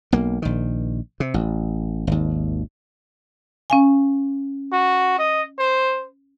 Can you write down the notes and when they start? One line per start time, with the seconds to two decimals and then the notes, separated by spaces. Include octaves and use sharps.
0.12 B1 A#3
0.42 A#1 D#3
1.20 C3
1.34 A1
2.07 G#1 D#2
3.70 C#4 F5 G#5
4.72 F#4
5.18 D#5
5.59 C5